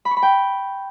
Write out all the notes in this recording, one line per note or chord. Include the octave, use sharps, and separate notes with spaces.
B5
C#6
B5
G5